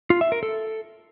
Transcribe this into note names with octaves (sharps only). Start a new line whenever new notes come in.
F4
E5
A#4
A4